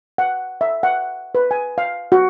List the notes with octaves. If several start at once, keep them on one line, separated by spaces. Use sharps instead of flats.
F#5
E5
F#5
B4
G#5
F5
F#4